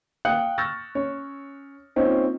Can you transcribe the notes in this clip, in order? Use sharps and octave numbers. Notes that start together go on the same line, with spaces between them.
F5 G5 D#6 F#6 C#7
C#6 E6 F6 G6 A6 A#6
C#4 C#5
A#3 C4 C#4 D#4 F4